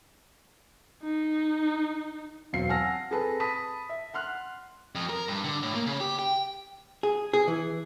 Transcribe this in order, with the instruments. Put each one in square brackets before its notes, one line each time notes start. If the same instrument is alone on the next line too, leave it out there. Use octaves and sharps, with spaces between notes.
[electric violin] D#4
[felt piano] E1 F#3 C4 F5 C7
F#5 G#5 A5 E6 F6 A#6
C4 G#4 A4 B4 A5
A5 B5 D#6 B6
E5
F#5 C6 F6 F#6
[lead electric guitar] F2
A#4
G2
D3
A2
A#3
C#3
G4
G5
[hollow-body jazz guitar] G#4
G#4
E3